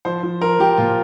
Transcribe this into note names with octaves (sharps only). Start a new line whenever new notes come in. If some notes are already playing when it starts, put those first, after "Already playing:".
F3 C5
F3
F3 A#4
F3 G4
A#2 F4